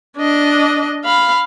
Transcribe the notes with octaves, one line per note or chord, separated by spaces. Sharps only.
D4 D#5
F5 B5